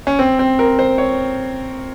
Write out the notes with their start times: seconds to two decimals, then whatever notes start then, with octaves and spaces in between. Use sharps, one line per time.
0.07 C#4
0.19 C4
0.39 C4
0.59 A#4
0.79 C5
0.98 C#5